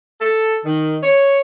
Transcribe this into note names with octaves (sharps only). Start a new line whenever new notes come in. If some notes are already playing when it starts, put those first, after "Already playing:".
A4
D#3
C#5